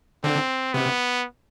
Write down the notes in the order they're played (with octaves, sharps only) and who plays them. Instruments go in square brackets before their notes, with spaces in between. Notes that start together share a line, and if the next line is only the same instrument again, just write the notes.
[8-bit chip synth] D3 [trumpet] C4
[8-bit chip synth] C3 [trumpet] B3